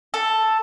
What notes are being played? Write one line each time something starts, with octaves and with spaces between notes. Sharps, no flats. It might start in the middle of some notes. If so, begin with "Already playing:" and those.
A4